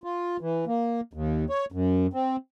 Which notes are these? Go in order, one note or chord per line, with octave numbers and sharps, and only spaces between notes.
F4
E3
A#3
D#2
C#5
F#2
C4